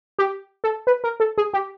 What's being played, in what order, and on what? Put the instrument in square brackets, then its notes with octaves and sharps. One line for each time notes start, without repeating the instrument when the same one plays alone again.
[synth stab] G4
A4
B4
A#4
A4
G#4
G4